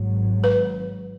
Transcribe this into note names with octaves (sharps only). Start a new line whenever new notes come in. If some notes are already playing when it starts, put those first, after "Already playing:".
Already playing: G#1 G#2 F#3
B4